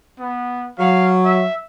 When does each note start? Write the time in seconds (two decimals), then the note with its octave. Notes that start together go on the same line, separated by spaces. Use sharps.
0.20 B3
0.79 F#3 F5
1.25 E5